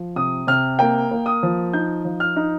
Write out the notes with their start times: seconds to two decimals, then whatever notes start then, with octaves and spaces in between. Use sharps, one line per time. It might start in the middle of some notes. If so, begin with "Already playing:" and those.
Already playing: F3
0.16 C3 D#6
0.47 C3 F6
0.79 A#3 G5
1.11 A#3
1.26 D#6
1.43 F3
1.73 D#4 G6
2.05 F3
2.20 F6
2.36 D#4